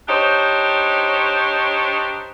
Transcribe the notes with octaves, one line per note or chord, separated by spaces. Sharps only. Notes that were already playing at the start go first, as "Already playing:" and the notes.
D4 D#4 G4 C5 C#5